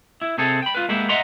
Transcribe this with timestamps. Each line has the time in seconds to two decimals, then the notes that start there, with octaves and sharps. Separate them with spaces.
0.21 E4
0.38 C3 C4 G#4 A4
0.62 G5 B5
0.75 F4 B4
0.89 G#3 A#3 B3 E4 G4
1.09 D#5 E5 F#5 A#5 C6